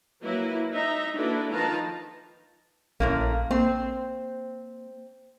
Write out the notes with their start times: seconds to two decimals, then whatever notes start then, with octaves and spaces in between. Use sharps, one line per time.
0.22 F#3 A#3 E4 B4
0.72 D#4 E5 A#5
1.17 A#3 D4 E4 F#4 A4 B4
1.51 D#3 F3 B4 F5 A5 A#5
3.00 A#1 F#2 A2 A#3
3.51 A#3 C4